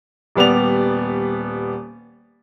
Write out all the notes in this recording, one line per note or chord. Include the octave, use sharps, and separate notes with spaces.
D#1 G3 B3 D5 F7